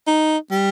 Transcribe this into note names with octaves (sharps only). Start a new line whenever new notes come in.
D#4
G3